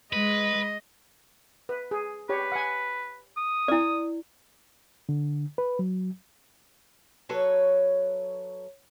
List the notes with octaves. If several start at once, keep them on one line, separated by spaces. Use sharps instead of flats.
G#3 B4 D#5
B4
G#4
G4 B4 C#5
F#5 G#5
D#6
E4 D5
D3
B4
F#3
F#3 A4 B4 C#5